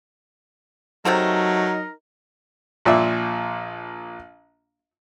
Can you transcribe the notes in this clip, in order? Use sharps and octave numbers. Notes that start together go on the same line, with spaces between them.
C3 F#3 A3 D#4 A4 A#4
A#1 A#2 D5 E5 C6